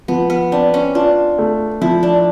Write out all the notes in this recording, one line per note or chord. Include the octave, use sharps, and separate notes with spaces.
F3 B3
B3
C4 D4
C#4
D4 F4
A3
F3 E4
D4